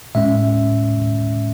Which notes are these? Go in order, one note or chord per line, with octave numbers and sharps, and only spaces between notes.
A2 G#3 C#4 E5